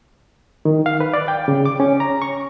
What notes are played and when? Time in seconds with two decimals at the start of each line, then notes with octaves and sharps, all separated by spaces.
0.65 D#3
0.86 F5
1.00 B4
1.14 D5
1.28 G5
1.48 C#3
1.65 D6
1.80 C#4
2.00 A#5
2.22 C#6